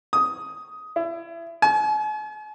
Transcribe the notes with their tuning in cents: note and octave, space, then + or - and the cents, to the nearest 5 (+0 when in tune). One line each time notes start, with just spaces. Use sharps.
D#6 +10
E4 +30
G#5 +45